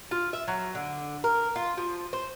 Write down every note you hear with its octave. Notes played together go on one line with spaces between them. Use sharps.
F4
E5
F#3
D3
A#4
F4
F3
C5